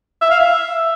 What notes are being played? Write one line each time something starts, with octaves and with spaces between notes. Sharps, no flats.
E5
F5
E5